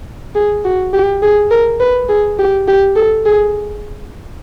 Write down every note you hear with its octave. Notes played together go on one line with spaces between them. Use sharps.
G#4
F#4
G4
G#4
A#4
B4
G#4
G4
G4
A4
G#4